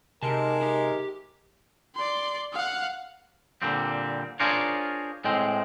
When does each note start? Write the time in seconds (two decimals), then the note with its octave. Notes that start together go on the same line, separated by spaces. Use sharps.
0.23 C3 G#3 D#4 A#4 A5
0.62 G4
1.95 D5 C6
2.53 F5 F#5
3.62 A#2 D3 G3 C4
4.40 D4 F4 G#4 A#4 C5 C#5
5.24 A2 G#3 C4